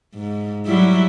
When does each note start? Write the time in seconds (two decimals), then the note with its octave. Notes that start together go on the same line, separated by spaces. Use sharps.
0.15 G#2
0.66 F#3 G3 E4